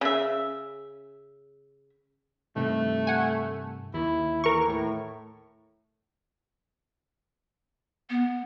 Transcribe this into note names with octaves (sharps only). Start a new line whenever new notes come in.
C#3 E5
G2 C3 D#3 A3
F#5 G#5
D#2 E4
E3 A#4 C#6
A2
B3